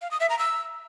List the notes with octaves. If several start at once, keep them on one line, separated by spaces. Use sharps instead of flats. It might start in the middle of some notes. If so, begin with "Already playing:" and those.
F5
D#6
E5
A#5
E6